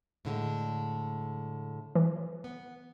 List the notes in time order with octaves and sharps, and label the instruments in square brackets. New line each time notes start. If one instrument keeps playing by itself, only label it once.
[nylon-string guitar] A2 D3 G#3
[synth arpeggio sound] E3
[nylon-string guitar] B3